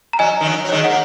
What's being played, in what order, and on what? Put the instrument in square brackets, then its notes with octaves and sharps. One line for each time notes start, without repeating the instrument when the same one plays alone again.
[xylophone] A#5
[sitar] F#3 [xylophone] D#5 G#5
[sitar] D#3
F#3
F#3
[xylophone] C#5
[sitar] D#3 G#3
[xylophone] D#5
F#5
[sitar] A#3